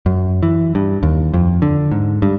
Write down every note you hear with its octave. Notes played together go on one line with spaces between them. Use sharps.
F#2
E3
G2
D#2
F2
D3
G#2
G2